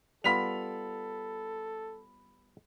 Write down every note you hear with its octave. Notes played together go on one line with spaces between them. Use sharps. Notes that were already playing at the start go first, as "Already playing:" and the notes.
G3 B3 F4 A4 B5 B6 F7